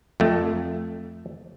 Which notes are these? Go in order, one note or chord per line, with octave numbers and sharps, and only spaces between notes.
F2 A3